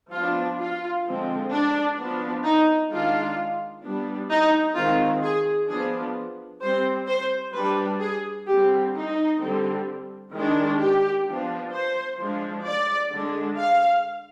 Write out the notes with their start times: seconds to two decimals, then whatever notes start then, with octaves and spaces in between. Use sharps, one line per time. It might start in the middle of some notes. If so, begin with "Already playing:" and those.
0.12 F3 B3 D4 F4
0.59 F4
1.06 D3 F3 G#3 C4
1.51 D4
1.98 F3 B3 D4
2.44 D#4
2.90 D#3 G#3 D4 F4
3.84 G3 B3 D4
4.30 D#4
4.76 D#3 G#3 C4 F4
5.23 G#4
5.68 F3 B3 D4 G#4
6.62 G3 C4 C5
7.09 C5
7.54 G3 D4 B4
8.00 G#4
8.47 D3 G3 C4 G4
8.94 D#4
9.40 D3 G3 C4
10.33 D#3 G#3 D4
10.79 G4
11.26 F3 B3 D4
11.72 C5
12.19 F3 G#3 D4
12.66 D5
13.11 D3 G#3 D4
13.58 F5